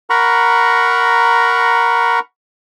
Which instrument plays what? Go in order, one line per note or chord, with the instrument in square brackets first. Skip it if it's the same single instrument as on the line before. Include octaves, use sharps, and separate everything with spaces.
[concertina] A#4 F#5 A#5 B5 C#6